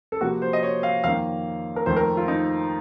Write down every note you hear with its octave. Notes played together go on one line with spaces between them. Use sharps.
A4
C3 F3 A#3 F#4
C5
D#5
C#5
F5
F2 D#3 A#3 F5
A#4
F2 D#3 A3 C5
A#4
F4
D#4